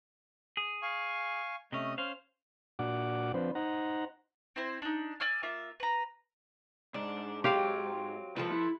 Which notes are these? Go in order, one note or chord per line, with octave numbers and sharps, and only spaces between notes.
G#4
F5 G#5 C#6
C3 A3 C#4 D#5 D#6
C#4 C5 F5
A#2 D4 F#4 F#5 D6
F3 C4 D4 B4 C5
D#4 C5 F#5 A#5
C4 E4 C5
D4 D#4
D5 G#5 E6 F6
A#3 F4 E5
B4 A#5
G#2 D4
F#3 C4 F4 G4 F5
D2 F3 F4 A4 B4
E4